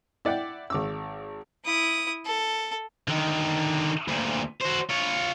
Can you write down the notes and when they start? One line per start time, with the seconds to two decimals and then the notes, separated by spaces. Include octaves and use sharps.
0.25 E4 D5 F#5 G5
0.70 G#1 D6 E6
1.65 E4 D#6
2.26 A4
3.08 D3 D#3
4.08 D2 A#2
4.61 F#4 C5
4.89 F4 C#5